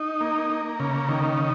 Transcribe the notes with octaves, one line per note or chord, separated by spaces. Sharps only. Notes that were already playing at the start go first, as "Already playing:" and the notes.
Already playing: D#4
A#3
A#3
C#3
D#3
D#4